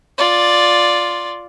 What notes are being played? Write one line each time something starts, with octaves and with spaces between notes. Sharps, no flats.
F4 D5